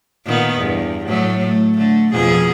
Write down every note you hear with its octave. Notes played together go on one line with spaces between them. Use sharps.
A#2 D#3 B3
E2 G2
A2 F#3 A3
A3
D3 A3
F2 B2 G#4